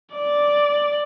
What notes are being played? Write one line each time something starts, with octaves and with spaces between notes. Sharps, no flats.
D5